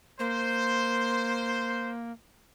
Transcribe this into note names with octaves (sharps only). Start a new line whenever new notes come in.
A#3 C5